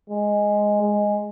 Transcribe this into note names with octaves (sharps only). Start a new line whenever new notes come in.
G#3
G#3